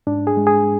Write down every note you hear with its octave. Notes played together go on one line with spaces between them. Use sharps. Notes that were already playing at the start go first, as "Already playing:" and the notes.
G#2 D4
G#4
G#3
G#4